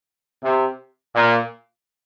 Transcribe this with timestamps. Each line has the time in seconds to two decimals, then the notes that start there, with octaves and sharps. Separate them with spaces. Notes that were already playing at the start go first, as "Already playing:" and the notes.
0.42 C3
1.15 A#2